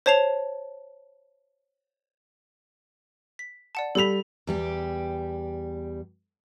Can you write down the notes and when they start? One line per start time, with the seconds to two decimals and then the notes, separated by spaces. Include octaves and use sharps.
0.06 C5 C#5 A5 C7 F7
3.39 B6
3.75 D5 F#5 A5
3.95 G3 A4 B5 B6 F7
4.47 E2 G3 G4